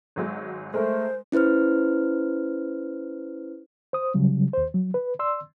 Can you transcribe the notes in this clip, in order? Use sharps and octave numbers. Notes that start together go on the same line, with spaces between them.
G#1 F#3 G#3
G#3 A3 A#4 C5
C#4 E4 B4 C5 F6
C5 D#6
C#3 F#3 G3
D#2 C5
F#3
B4
D5 C6 E6